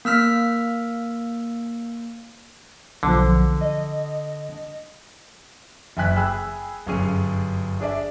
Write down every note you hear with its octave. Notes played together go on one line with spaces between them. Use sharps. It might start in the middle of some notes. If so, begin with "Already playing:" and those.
A#3 E6 F6 B6
B1 D3 F3
D#5
F#1 F#2 E5 G#5 F#6 B6
G#4 G5 G#5 B5 E6 F#6
G1 F#2 C#4 G#4 D#7
D4 G#4 D5 E5